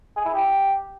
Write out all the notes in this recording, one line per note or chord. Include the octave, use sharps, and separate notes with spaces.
G#4
E4
G4